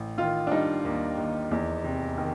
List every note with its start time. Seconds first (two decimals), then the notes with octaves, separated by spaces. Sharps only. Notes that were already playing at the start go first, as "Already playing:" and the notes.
Already playing: A1
0.18 D#3 F4
0.47 D4
0.52 G3 D#4
0.85 D#2
1.18 D#2
1.51 E2
1.84 C3
2.18 D#3